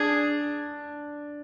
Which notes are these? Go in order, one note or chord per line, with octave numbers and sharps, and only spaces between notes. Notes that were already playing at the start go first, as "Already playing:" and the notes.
Already playing: D4 G#4